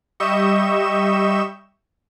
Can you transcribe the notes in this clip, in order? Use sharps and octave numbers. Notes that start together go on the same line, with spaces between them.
G3 D#5 E5 C#6 G6 E7